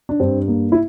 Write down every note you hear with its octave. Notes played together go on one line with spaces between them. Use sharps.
D4
G2 C4
A#3
E4